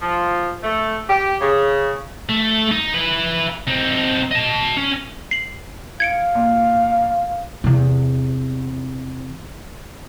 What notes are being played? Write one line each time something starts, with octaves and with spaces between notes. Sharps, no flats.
F3
A3
G4
C#3
A3
D#4
E4 B4
C4 D#4
D#5 A5
C#4
C7 F#7
F5 G#6 C#7 D7
A#2
E2 C3